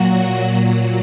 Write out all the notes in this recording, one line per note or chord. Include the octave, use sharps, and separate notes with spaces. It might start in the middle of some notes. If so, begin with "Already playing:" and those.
Already playing: A#2 F#3 F#4
A#2 F#3